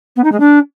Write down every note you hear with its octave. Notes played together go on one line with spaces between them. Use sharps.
B3
D#4
G#3
D4